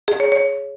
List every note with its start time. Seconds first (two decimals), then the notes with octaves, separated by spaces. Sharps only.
0.08 G#4
0.20 C#5
0.32 C#5